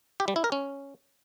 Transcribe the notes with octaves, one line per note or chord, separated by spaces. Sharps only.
G4
G3
E4
A#4
C#4